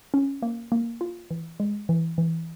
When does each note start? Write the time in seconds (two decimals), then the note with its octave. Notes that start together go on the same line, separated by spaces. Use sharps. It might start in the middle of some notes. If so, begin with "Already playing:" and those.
0.14 C#4
0.42 A#3
0.72 A#3
1.01 F4
1.31 E3
1.60 G#3
1.89 E3
2.18 E3